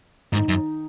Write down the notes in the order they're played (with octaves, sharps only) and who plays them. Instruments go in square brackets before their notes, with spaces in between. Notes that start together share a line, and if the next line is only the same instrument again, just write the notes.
[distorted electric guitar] G#2 [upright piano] D#3 D#4
[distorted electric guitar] F#2